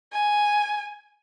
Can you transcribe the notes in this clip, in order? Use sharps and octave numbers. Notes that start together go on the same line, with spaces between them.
G#5